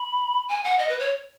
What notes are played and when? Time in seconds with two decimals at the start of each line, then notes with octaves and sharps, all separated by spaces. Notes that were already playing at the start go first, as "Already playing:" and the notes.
Already playing: B5
0.49 G#5
0.64 F#5
0.78 D#5
0.89 B4
0.99 C#5